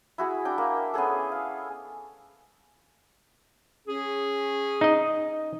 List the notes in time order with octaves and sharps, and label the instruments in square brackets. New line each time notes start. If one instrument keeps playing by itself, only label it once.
[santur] E4 F#4 G#4
D4 G5
A#3
B3 C#4 G#4 A4
F5
[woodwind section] C#4 G#4
[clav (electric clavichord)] D#4 D#5